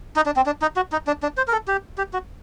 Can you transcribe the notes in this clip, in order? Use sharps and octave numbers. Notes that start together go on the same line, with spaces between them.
D#4
D4
C4
D4
D#4
F#4
D#4
D4
D4
C5
A#4
A4
G4
G4
F#4